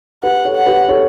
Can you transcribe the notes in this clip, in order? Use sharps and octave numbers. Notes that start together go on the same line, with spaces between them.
G4 B4 F#5
A4 C#5
F#5
G4 B4
A4 C#5